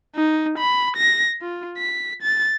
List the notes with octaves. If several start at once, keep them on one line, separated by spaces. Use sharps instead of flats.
D#4
B5
A#6
F4
B6
A6